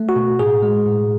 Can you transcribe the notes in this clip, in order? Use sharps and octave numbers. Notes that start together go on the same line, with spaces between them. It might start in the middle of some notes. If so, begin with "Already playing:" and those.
Already playing: A3
F#4
B2
A2 G#4
G#3
A2